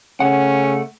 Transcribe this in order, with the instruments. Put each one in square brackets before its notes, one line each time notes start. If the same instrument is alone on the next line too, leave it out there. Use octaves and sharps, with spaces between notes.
[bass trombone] C#3 [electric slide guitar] A3 F#5 [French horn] C#4